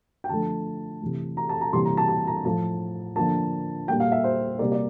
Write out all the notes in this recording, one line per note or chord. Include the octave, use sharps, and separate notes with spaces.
G5
D3 F3 A3 A5
C3 E3 A3
A#5
A5
A#5
C3 E3 G3 A#3 C6
A#5
A5
A5
A#5
A2 F3 A3 A5
D3 F3 A#3 A5
A#2 G3 A#3 G5
F5
E5
C5
C3 G3 A#3 D5
D5